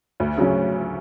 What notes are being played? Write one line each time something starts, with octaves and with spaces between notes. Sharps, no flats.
D2
C#3 F#3 C#4